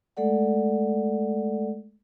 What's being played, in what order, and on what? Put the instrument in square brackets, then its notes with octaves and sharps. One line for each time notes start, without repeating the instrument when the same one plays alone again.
[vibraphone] G#3 A3 A4 D5 F#5